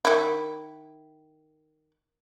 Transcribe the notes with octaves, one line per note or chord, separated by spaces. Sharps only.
D#3 E4